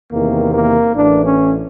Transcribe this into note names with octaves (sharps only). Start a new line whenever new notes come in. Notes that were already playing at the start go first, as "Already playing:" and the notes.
E2 C3 D#3 A#3
A#3
A1 A2 E3 D4
C#4